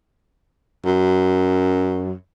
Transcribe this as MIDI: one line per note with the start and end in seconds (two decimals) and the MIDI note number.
0.85 2.14 42